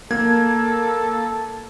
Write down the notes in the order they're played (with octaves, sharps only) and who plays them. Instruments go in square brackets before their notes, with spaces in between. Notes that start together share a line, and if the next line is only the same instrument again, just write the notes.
[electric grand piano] A#3 G#6 [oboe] A4